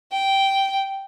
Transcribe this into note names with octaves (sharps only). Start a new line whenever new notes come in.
G5